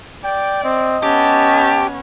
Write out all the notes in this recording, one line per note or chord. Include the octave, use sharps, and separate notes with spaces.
D5 G5
C4 D#5
B3 C#4 G4 A5